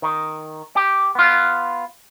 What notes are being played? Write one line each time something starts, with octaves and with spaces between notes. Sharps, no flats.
D#3
G4
B3 F4